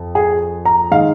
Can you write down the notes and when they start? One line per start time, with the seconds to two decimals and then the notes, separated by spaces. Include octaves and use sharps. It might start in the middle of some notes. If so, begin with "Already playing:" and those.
Already playing: F2
0.15 G#4
0.65 A#5
0.91 D#3 G#3 F5